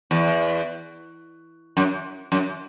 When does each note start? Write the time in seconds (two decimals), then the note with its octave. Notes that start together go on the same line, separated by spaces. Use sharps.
0.11 E2
1.77 F#2
2.32 F#2